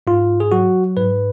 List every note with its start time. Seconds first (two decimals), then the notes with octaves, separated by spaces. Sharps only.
0.07 G#2 F4
0.40 G#4
0.52 F#3 F#4
0.97 G#2 B4